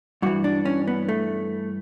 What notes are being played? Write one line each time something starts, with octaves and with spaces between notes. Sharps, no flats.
G2 E3 F#4
D4
C#4
B3
A3